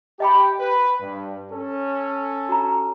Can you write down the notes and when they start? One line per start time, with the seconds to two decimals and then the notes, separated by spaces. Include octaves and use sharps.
0.20 G4 D#5 G5 B5
0.60 B4
1.01 G2
1.51 C#4 A4
2.49 F#4 A#5